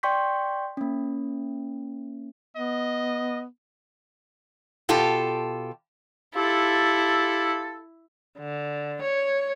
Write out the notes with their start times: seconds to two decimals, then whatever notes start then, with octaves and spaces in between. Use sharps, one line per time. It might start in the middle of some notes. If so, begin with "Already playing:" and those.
0.03 D5 G5 C6 C#6 G6 B6
0.77 A#3 C#4
2.57 B3 D#5
4.89 B2 F4 G4 A4
6.35 E4 F4 G4 A4
8.39 D3
9.02 C#5